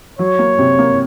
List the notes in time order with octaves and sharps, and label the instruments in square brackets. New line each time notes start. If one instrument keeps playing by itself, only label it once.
[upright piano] F#3 [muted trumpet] C#5
[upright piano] A#3
C3
A#3